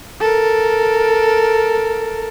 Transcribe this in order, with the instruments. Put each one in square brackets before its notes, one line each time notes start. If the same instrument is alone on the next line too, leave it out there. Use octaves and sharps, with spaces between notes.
[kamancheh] A4 A#4